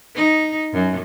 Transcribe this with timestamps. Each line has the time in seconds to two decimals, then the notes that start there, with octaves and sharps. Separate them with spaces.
0.16 D#4
0.73 F#2